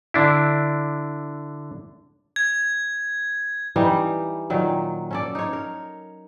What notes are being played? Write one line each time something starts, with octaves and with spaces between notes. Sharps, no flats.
D3 D4 E4
G#6
E3 G3 D#4
A#2 D#3 F#3
C#4 A4 D5
D#4 C#5
A#4